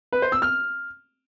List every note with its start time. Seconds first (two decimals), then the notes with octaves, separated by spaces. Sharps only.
0.13 B4
0.22 C5
0.32 E6
0.42 F6